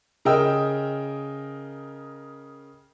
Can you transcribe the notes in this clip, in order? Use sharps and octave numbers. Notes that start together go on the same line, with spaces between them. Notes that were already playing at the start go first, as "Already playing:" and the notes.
C#3 A#4 D#5 G5 E6